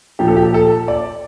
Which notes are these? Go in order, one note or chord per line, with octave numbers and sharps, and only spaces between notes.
A#2 F3 G4
A4
G4
A4
D5